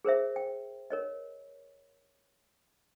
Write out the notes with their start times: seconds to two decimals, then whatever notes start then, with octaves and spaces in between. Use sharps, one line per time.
0.05 G#4 A#4 C5 E5
0.36 G5
0.90 A#4 C#5 D#5